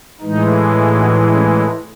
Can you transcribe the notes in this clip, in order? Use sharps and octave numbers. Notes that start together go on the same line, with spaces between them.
A2 E3 G#3 D#4
D#4 F#4
C#4 E4